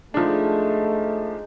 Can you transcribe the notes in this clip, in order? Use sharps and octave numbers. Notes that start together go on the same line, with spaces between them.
F3 G#3 A3 D4 D#4